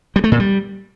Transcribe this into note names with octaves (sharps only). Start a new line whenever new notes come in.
G3
A3
A#2
G3